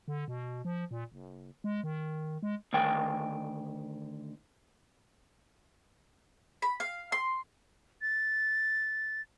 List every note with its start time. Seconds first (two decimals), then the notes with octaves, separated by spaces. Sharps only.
0.08 D3
0.28 B2
0.65 F3
0.91 A#2
1.12 F#1
1.64 G#3
1.83 D#3
2.43 G#3
2.73 D2 D#3 G5 G#5
6.62 B5
6.80 F5
7.12 C6
8.02 A6